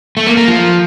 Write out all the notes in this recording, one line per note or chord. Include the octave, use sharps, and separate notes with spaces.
A3
A#3
A#3
F3